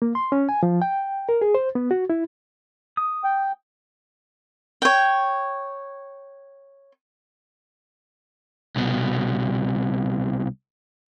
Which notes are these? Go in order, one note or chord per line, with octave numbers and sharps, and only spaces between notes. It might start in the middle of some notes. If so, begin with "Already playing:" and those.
A#3
C6
C#4
G#5
F3
G5
A#4
G#4
C5
B3
F#4
E4
D#6
G5
C#5 G5
C2 B2